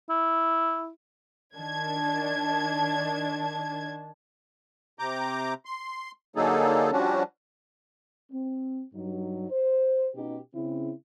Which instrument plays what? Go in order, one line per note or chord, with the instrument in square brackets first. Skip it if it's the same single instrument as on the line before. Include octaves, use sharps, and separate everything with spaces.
[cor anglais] E4
[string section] D#3 D4 A5 G#6
[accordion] C3 A#5 D6 G6
C6
D3 F#3 A#3 D#4 G#4 A4
F3 G3 C#4 D4 F#4
[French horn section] C4
G2 F#3 D#4
C5
B2 C#4 D#4 G4
C#3 C4 E4